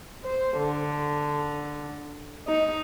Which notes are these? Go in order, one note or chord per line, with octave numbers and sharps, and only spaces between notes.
C5
D3
D#4